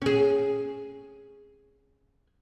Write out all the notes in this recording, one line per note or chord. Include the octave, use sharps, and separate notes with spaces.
C#4 G#4